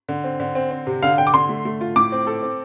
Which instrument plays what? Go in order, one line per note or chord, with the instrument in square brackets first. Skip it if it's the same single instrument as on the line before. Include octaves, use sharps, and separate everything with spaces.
[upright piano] D3
C4
D3
C4
C4
C3
[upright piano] D3 [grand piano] F5
[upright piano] D3 [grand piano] G5
[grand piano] D6
[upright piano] D3 [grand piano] C6
[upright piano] A3
A3
F4
[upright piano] A2 [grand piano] D6
[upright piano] C4
A4
C4